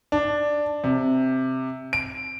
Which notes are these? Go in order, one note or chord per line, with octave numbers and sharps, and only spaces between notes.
D4
C3
D7